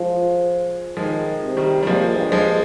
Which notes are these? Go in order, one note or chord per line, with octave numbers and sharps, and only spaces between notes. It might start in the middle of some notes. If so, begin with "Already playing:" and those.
Already playing: F3 G#3
D#3 F3 G#3
C3
D#3 G3
G3
A#2 F3 G#3
G2
F3 G#3